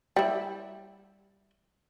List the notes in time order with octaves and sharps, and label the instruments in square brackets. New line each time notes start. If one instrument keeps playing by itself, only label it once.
[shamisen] G3 E4